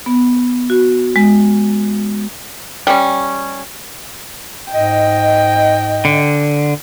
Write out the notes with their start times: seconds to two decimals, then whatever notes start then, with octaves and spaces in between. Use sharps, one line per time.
0.06 B3
0.70 F#4
1.16 G#3
2.87 G3 C#4
4.71 G#2 D#5 G5
6.05 D3